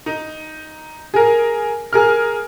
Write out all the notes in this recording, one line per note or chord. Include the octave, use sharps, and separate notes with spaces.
D#4
G#4 A#4
G#4 A#4 F6